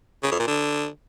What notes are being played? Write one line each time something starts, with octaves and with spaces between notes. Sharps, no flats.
C#3
F2
A#2
D3